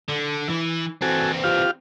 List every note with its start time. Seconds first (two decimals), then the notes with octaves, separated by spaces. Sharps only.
0.09 D3
0.49 E3
1.02 E3 C4 F#4 A4 G#5
1.44 F4 G4 F5